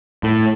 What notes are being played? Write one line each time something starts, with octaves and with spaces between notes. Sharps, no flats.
A2